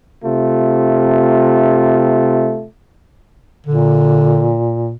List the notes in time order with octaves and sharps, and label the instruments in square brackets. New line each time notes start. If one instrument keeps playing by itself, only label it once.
[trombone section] C3 A3 F4
[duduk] A#2 [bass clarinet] D3